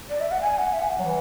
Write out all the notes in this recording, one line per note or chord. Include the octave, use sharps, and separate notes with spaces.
D5
E5
F#5
G#5
F#5
E5
G#5
F#5
F#3
E3